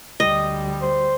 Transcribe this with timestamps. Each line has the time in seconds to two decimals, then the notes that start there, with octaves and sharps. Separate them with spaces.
0.20 D2 G3 D#5
0.82 C5